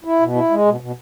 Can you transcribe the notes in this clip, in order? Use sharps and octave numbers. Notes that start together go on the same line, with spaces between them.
E4
B2
E4
G#3
B2
B2